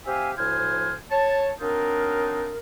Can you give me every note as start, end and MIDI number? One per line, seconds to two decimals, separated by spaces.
0.06 0.32 60
0.06 0.32 67
0.06 0.32 72
0.06 0.32 76
0.06 0.32 77
0.06 0.32 80
0.38 0.93 38
0.38 0.93 45
0.38 0.93 53
0.38 0.93 72
0.38 0.93 80
0.38 0.93 89
1.11 1.50 73
1.11 1.50 81
1.61 2.58 54
1.61 2.58 60
1.61 2.58 62
1.61 2.58 63
1.61 2.58 65
1.61 2.58 70